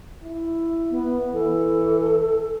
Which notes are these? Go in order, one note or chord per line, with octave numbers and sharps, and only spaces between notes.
E4
B3
E3 A4